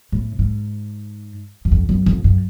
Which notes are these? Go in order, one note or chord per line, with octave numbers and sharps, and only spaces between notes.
A2
G#2
F#2
F2
F#2
F2
F#2